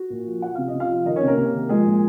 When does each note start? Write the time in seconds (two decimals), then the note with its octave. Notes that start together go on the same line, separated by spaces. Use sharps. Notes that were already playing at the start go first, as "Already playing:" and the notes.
Already playing: F#4
0.10 A#2
0.26 F3
0.42 F3 F#5
0.55 C3 F5
0.68 D#5
0.74 C3
0.80 F4 F5
0.89 F3
1.06 D#3 D#4 D#5
1.16 C#4 C#5
1.22 C3
1.27 A#3 A#4
1.38 C3
1.53 D#3
1.69 F3 G#3 G#4
1.86 A#2